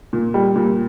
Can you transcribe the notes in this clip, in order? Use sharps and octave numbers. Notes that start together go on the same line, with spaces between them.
A#2
G3
A#2